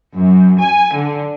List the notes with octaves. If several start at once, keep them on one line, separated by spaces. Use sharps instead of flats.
F#2
G#5
D3